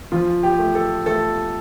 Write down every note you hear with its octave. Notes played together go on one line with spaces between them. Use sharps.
F3 F4
G4
A3
A4
A3 A4